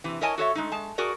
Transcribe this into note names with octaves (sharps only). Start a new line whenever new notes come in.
C3 E3
E4 A#4 C#5 D#5 G#5 A5
F#4 A4 C#5 E5
G#3 A3 D#4
G#3 A5
F#4 G#4 A#4 D5